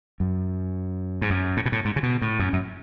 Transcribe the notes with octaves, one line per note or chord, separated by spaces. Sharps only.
F#2
G#2
F#2
A2
B2
A2
G#2
C#3
B2
A2
F#2
F#2